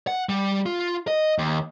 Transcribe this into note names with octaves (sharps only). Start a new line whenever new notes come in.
F#5
G3
F4
D#5
D#2